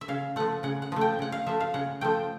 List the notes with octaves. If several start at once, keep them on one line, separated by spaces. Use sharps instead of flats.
E5
C#3 F5
F3 A3 F#5
C#3 F#5
F#5
F3 A3
G5
C#3 F#5
F5
F3 A3 E5
F5
C#3 F#5
F3 A3 G5